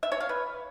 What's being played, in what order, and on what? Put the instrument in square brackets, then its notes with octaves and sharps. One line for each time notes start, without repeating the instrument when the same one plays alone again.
[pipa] E5
C#5
F5
B4